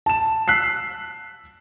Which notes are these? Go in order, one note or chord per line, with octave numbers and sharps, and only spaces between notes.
A5 E7
E6 F#6 B6 C7